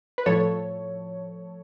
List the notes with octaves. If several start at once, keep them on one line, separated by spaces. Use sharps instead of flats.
B4
A2 F3 A4 C#5